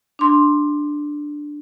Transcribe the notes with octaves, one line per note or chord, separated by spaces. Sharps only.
D4 C6